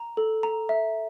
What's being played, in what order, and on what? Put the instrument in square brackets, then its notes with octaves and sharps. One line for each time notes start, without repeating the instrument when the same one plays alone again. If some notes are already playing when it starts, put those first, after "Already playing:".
Already playing: [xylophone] A#5
A4
A#5
E5